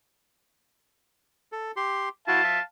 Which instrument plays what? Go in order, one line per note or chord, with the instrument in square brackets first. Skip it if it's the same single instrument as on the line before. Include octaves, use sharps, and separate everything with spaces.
[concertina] A4
G4 C6
[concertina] E4 F#4 [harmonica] F5 A5
[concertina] E5